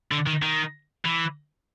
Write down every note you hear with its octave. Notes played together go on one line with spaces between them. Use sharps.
D3
D#3
D#3
E3